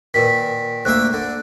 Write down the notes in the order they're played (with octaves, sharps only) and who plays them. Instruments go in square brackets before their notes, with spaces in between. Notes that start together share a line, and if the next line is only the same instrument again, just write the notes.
[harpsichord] A#2 D#3 [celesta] B4 B6
[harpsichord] D2 A#3 E5 [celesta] F#6
[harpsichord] D3